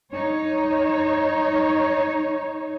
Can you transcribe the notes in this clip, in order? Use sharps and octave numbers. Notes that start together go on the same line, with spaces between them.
D#4 C#5